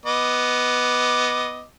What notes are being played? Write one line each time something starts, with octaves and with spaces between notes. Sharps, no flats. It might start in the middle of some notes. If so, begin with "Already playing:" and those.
B3 D#5 D6